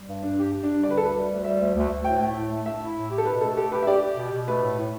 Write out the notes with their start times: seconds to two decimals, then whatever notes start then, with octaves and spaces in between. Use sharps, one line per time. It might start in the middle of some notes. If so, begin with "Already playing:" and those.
Already playing: G3
0.08 G2
0.23 G2 D4
0.38 G4
0.53 G4
0.63 D4
0.69 G3
0.83 D3 D5
0.90 B4
0.97 D2 A4
1.05 B4
1.14 G3
1.29 D2
1.44 G3 E5
1.59 D2
1.75 D2
1.90 D2
2.04 A2 G5
2.20 A3
2.36 A2
2.50 A3
2.65 A3 E5
2.81 E4
2.96 A2
3.10 G4
3.18 A4
3.26 B2 B4
3.41 A3 A4
3.56 G4 A4
3.72 G4 B4
3.82 E5
3.87 G4 D5
4.02 G4
4.17 B2
4.32 B2
4.47 A3 B4
4.62 A2
4.77 A2